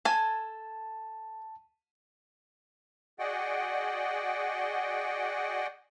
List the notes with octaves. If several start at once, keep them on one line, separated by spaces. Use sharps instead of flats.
A4 G#5 A5
F#4 G#4 D5 D#5 F#5 G5